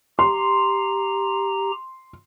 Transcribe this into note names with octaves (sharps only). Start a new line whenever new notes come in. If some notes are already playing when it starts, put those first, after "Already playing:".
G4 A#5 C6